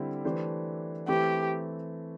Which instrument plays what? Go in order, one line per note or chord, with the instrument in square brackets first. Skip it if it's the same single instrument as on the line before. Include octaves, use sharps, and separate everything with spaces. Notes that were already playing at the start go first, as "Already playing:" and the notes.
Already playing: [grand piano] D3 G3 C4 E4
E3 A3 D4 G4 C5
[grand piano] E3 A3 C4 [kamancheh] G4